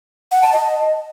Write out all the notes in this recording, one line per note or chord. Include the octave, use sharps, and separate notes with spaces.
F#5
A5
D#5